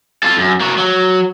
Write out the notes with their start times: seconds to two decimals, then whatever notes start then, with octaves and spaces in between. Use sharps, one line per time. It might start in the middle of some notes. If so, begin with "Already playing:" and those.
0.23 F4 A4
0.38 F#2
0.60 A#3 F#4
0.78 F#3